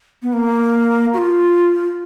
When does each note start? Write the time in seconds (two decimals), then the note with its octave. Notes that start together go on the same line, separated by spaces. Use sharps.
0.22 B3
0.33 A#3
1.13 F#4
1.18 F4